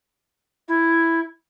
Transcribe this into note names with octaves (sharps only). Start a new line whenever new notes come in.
E4